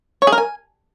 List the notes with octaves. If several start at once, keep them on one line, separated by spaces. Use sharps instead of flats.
C#5
G#4
A#4
G#5